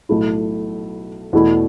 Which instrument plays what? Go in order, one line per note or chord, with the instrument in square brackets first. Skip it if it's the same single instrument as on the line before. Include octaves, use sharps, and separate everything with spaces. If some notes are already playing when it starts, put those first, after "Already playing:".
[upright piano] B1 A2 A3 E4
E2 B2 A3 E4